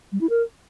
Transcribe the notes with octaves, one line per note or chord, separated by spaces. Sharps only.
G3
E4
A#4